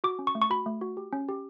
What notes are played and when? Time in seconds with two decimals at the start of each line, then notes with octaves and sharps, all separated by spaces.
0.04 F#4 D6
0.19 C#4
0.27 C#6
0.35 A3
0.42 C#6
0.50 F#4 B5
0.66 A3
0.81 F#4
0.97 G4
1.13 C#4
1.29 G4